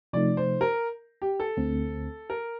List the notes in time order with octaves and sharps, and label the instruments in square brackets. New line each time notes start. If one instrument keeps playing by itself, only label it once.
[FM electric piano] C3 F3 A3 D#4 [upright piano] D5
[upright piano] C5
A#4
G4
A4
[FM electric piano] D2 D3 A3 C4
[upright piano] A#4